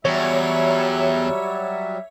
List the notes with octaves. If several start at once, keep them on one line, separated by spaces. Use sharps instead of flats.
E2 F#3 G3 C#5 E5